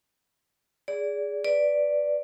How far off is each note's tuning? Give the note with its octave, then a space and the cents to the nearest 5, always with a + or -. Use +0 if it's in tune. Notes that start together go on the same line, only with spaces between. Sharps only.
G#4 -10 D5 -25
B4 +0 D5 +0